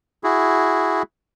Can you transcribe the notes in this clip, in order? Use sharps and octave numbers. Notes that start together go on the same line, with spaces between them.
E4 F#4 G#4